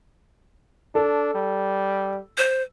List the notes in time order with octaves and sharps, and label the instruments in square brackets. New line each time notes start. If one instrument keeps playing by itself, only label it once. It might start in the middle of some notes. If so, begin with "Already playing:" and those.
[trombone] D4 [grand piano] A4
[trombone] G3
[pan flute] C5